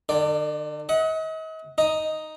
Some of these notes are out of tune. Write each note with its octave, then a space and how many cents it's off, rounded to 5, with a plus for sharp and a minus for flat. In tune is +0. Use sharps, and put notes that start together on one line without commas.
D3 +45 D5 +0
D#5 +40 F#5 +0
D#4 +0 D#5 +0